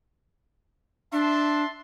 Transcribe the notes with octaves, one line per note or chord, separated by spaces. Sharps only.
D4 E5 A5 C6